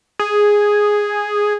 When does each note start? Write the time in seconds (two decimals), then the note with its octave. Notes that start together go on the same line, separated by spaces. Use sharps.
0.19 G#4